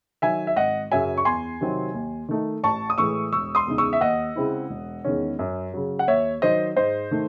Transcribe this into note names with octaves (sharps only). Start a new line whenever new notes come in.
D#3 F#3 E5 G#5
E5
G#1 D#5 F#5
F#2 C#3 F#3 C#4 E5 G#5
C#6
E2 G#5 C6
C3 D#3 F#3 C4
D#2
D#3 A3 D#4
A1 A5 C#6
D#6
A2 E3 G#3 C#6 E6
E1 C#6 E6
C6 D#6
E2 C#3 G#3 D#4
C#6 E6
E5
D#2 D#5 F#5
C#3 G#3 C4 E4
E1
E2 D#3 G#3 C#4
F#2
C#3 F#3
F#5
D#2 C#5 E5
D#3 F#3 C5 D#5
G#2 C5 D#5
D#3 A3 D#4